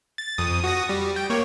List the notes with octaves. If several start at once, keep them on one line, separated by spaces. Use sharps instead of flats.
A6
F2 D#6
F#4 D#6 A#6
G3
G5
A#3 C#5